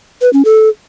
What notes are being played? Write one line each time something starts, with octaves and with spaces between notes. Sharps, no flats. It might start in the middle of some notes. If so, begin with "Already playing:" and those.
B4
C#4
A4